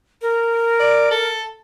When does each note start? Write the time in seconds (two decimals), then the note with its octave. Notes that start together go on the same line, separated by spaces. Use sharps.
0.21 A#4
0.80 D5
1.11 A4